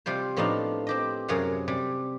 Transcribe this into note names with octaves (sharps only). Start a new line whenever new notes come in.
C3 G3 F4 C5
A2 F3 B3 D4 D#4 F5
C4 G4 D#5
F#2 C3 G#4 F5 F#5
C3 G3